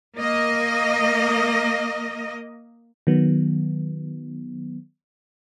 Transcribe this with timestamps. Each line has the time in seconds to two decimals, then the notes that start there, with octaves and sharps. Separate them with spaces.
0.17 A#3 D#5
3.07 D#3 F#3 B3